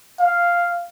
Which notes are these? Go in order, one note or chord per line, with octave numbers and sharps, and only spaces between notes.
F5